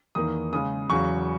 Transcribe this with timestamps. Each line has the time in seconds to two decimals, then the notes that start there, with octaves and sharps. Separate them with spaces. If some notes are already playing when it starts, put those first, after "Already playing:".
0.15 E2 D#3 A#3 D#6
0.52 C#3 G#3 C#4 D#6
0.90 E2 C#3 F#3 C#6